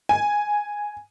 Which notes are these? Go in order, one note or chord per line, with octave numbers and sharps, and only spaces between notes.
G#5